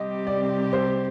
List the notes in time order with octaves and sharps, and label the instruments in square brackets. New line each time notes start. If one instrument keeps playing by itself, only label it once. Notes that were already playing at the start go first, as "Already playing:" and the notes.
Already playing: [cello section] C3 G3 C4 G4 [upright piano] D#5
[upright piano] D5
C5